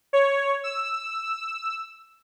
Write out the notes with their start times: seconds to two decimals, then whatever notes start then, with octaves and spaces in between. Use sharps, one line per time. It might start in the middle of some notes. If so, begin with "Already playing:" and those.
0.13 C#5
0.64 E6